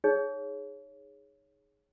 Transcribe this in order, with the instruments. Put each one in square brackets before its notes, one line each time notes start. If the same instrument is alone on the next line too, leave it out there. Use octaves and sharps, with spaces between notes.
[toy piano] D#4 G#4 C#5